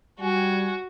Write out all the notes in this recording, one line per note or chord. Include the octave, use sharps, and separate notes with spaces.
G3 F#4 G#5